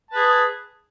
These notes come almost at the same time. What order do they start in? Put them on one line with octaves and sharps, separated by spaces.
A5 B4 G#4